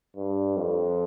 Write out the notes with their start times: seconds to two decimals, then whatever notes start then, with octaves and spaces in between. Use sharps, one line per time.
0.16 G2
0.57 F2